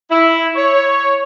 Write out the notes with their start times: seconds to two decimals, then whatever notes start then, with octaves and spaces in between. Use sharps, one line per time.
0.11 E4
0.56 C#5